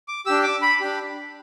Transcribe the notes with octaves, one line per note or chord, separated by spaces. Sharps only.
D6
D4 G4 E6
D6
B5
D4 G4